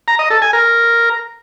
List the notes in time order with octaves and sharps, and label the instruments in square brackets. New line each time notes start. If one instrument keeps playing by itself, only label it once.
[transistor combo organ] A#5
D#5
A4
G#5
A#4